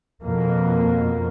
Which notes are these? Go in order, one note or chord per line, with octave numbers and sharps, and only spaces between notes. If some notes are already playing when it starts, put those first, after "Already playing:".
F2 B2 A#3